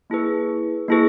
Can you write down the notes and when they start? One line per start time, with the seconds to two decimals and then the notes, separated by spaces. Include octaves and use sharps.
0.10 A#3 E4 G#4 B4
0.88 A#3 E4 G#4 B4